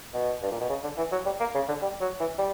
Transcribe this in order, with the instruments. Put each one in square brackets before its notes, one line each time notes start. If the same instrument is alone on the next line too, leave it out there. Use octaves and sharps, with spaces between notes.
[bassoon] B2
G2
A#2
B2
C#3
D3
E3
F#3
G3
A#3
C#3
D3
G3
F#3
E3
G3